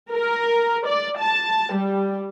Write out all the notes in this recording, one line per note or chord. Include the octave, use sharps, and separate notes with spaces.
A#4
D5
A5
G3